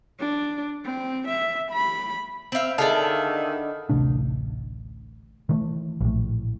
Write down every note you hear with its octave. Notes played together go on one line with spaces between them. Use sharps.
D4
C4
E5
B5
C4 E5 F5 B5
D3 D#3 E4 G#4 D5 E5 F5 A5
A1 D2 C3 D4
D#3 E3 A3
A#1 A2